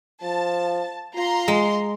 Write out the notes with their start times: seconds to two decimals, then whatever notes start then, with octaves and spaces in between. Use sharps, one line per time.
0.23 F3 A5
1.16 F4 A#5 C6
1.48 G#3